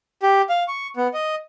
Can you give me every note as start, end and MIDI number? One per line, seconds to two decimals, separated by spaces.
0.23 0.42 67
0.49 0.63 77
0.68 0.87 85
0.97 1.07 59
1.14 1.35 75